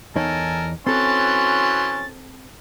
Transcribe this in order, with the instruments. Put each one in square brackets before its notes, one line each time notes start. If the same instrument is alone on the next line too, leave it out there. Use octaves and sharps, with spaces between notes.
[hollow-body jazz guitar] E2 D#4 C#5 [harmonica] A4 A#4 G#5
[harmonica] E3 F#3 C6 [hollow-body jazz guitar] C4 A4 [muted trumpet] C#4 [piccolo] A6